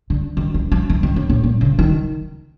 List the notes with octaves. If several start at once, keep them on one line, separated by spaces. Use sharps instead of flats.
D3
D#3
E3
F3
E3
D#3
A2
A2
A#2
C#3
D#3